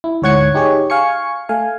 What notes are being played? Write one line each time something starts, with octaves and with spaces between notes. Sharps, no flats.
E4
D2 G#2 C#5 F#5 G#6 C#7
D#4 G4 G#4 C#5
F5 G#5 C#6 C#7
A3 F5 G#5